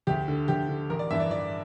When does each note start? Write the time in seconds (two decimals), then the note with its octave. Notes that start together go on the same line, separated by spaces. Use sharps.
0.07 D2 G4
0.28 D3
0.48 D2 G4
0.69 D3
0.90 A1 A#4
0.99 D5
1.10 G2 E3 E5
1.20 D5
1.30 A1 D5